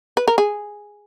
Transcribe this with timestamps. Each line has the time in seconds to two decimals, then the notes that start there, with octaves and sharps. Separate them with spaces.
0.17 B4
0.28 A#4
0.38 G#4